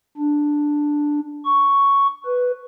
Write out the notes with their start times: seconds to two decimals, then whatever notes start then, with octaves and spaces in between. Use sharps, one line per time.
0.17 D4
1.45 C#6
2.26 B4